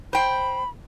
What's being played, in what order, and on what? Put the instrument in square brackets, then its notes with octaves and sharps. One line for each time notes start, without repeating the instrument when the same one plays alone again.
[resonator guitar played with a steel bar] C5 G5 [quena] B5